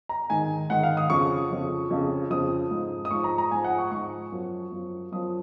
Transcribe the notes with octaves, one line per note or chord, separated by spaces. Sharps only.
A#5
G#2 D#3 G#5
G#2 D#3 F#5
F5
D#6
F2 C#3 F3 C#6
F2 C#3 F3
F2 C#3 F3
F2 C#3 F3 D#6
G#2 F3
D#6
G#2 F3 C#6
A#5
A#5
G#2 F3 G#5
F#5
C#6
G#2 F3 C#6
F#2 F3
F#2 F3
F#2 F3 D#6